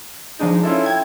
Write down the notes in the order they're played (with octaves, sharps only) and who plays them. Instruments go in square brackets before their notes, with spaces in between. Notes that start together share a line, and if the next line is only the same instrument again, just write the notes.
[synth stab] F3 D4 D#4 [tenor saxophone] G#3
[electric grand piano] C#4 F4 A4 [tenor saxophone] E4
[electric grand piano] G5 [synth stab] G#6